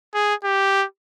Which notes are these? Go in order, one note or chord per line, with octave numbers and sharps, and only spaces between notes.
G#4
G4